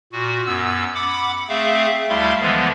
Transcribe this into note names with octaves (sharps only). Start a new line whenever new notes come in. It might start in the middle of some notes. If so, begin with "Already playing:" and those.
A#2 F#4
F#2 B3 E6
F#5 B5 D6
A3 C4 G#4 E5 F5
D2 G3 A3 E4 F5 C6
D3 E3 F3 G#3 B3